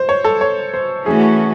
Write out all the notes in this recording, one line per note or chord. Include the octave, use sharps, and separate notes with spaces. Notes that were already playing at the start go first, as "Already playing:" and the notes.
Already playing: C5
C#5
A4
C#5
C5
E3 A3 C#4 F#4 G#4